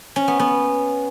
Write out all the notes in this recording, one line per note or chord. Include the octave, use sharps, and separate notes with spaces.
C#4
B3
B3